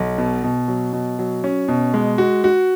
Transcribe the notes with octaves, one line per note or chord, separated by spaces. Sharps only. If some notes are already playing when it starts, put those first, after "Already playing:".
Already playing: B1
B2
B2
F#3
B2
F#3
C#4
B2
G#3
F#4
F#4